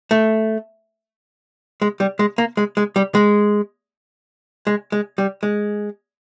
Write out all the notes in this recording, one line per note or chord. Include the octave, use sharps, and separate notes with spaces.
A3
G#3
G3
G#3
A#3
G#3
G#3
G3
G#3
G#3
G#3
G3
G#3